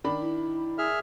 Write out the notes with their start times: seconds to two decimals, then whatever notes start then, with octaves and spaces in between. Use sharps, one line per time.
0.04 D#3 D4 B5
0.21 E4
0.78 G#4 E5 F6